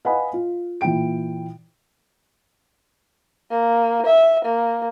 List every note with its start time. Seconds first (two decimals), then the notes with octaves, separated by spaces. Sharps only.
0.05 B4 D#5 F5 F#5 G#5 B5
0.33 F4
0.81 A#2 E3 E4 F4 G5 D7
3.50 A#3
4.06 E5
4.45 A#3